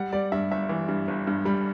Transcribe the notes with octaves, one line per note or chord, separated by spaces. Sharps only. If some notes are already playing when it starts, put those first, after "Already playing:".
Already playing: G3 F#5
G3 D5
G2 E5
G1 E5
E3
G2
G1
G2
G3 B5